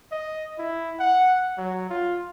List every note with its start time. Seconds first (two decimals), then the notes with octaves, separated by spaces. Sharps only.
0.12 D#5
0.58 E4
1.00 F#5
1.58 F#3
1.90 F4